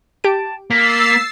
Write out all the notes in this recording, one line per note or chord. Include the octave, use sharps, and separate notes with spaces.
G4 A5 D7
A#3 E6 A6 B6 C7